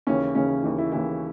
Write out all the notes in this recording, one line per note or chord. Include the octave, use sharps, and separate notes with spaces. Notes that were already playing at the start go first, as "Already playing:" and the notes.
D#2 C#3 E3 C#4
D#2 C#3 E3 C#4
D#2 C#3 E3
E4
D#2 C#3 E3 E4